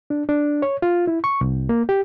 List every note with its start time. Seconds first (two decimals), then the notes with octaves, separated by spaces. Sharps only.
0.10 D4
0.29 D4
0.62 C#5
0.82 F4
1.07 E4
1.24 C#6
1.41 C2
1.69 A#3
1.89 G4